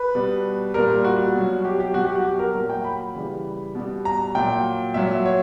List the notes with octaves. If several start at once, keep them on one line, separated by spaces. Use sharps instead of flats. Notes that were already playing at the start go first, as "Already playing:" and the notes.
Already playing: B4
B2 G3
A#2 G3 A#4
F#4
B2 F#3
G4
G4
B2 F#3 F#4
G4
F#4
G4
A#4
A#2 F#3 A#4
G5
B5
C#3 E3 G3
B2 G3
A#5
A#2 F#3 G5
A#2 F#3 E5
C#5